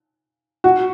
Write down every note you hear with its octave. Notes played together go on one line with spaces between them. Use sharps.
F#4